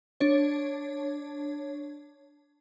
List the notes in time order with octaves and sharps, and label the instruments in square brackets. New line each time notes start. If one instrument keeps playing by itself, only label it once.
[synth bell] D4 C#5